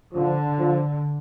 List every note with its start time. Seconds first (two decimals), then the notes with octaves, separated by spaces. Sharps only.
0.14 D3 F3
0.59 F3